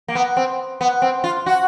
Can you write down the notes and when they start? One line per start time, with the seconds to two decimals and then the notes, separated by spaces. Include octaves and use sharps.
0.08 A#3
0.15 B3
0.37 C4
0.81 B3
1.02 C4
1.24 F4
1.46 F#4